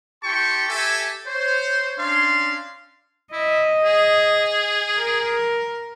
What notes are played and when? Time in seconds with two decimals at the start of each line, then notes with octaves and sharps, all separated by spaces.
0.23 E4 G4 G5 A5 C6 C#6
0.67 G4 A4 E5 G#5
1.26 C5 C#5
1.98 C#4 D4 F5 C6
3.32 E4 D#5
3.84 G#4
4.98 A#4